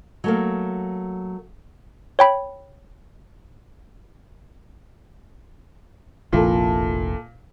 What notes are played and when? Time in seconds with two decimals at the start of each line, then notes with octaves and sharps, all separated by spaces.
0.24 F#3 A3 A#3
2.19 C#5 G5 B5
6.33 F1 A#1 A#2 F3 E4 A4